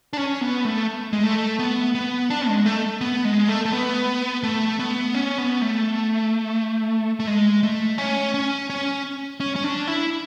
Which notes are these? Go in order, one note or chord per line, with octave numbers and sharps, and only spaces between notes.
D4
C#4
B3
A3
G#3
A3
B3
B3
D4
G#3
A3
B3
G#3
A3
A3
B3
A3
B3
C#4
B3
A3
A3
G#3
A3
C#4
C#4
C#4
C#4
C#4
D4
E4